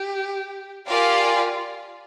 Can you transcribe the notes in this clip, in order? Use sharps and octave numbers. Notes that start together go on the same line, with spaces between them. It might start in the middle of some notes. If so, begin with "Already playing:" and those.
Already playing: G4
F4 G4 A#4 D5 F5 G#5